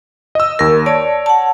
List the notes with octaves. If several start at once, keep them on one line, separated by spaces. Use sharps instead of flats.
D#5 E6
D#2 A#4 A#6
C#5 D5 A5
F#5 A5